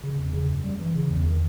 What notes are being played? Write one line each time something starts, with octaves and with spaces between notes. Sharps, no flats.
C#3
E2
C#3
F#2
G3
E3
C#3
E2
D#3